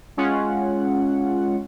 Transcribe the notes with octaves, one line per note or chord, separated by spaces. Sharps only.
G#3 C#4 F4 F#5